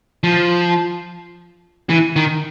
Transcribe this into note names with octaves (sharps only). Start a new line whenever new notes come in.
F3
E3
D#3